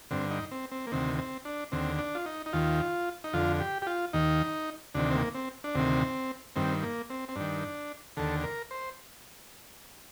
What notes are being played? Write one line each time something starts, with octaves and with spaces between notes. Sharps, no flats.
G2 D3 C4
D#4
C4
C4
A#3
D2 C3 D#3 C4
C4
D4
D#2 D3 C4
D4
F4
D#4
D#4
D#2 D#3 F4
D#4
F2 D3 F4
G4
G4
F4
D#2 D#3 D#4
D2 C3 D#3 D4
C4
A#3
C4
D4
D2 C3 D#3 C4
G2 D#3 C4
A#3
C4
C4
G2 D#3 D4
D#2 D3 A4
A#4
C5